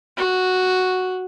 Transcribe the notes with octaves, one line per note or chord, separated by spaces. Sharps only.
F#4